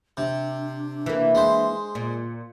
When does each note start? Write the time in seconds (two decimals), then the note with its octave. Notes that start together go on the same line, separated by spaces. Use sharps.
0.17 C3 D4
1.06 E3 A#3
1.35 G#3 C5
1.95 A#2